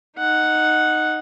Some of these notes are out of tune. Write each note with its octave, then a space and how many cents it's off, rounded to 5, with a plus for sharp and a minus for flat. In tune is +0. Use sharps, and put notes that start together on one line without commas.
D#4 +0 F#5 +0